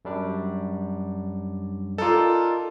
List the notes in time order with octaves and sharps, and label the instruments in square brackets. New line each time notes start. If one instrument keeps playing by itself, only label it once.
[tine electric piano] F#2 G3 D4
[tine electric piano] D#4 A#4 D5 [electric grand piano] F4 A4